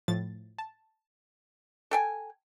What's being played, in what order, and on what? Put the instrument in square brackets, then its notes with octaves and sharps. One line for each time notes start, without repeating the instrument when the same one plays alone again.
[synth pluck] A2 F3 A6
A5
[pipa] A4 G5 G#5